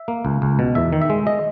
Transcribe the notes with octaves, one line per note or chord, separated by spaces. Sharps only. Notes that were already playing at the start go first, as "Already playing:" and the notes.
Already playing: E5
A#3
C#2
C#2
B2
E2 E5
D#3
E5
G#3
D#5